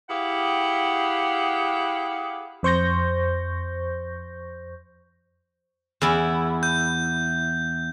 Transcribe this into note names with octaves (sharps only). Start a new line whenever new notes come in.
E4 G4 G#4 F5 F#5
F2 C5 C#6 G6 A#6
E2 E4
G6